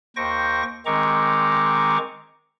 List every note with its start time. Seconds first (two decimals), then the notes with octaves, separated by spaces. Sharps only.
0.16 D#2 C5 G5 C#6 A#6
0.86 D#3 G#3 C4 A#5 C#6 D6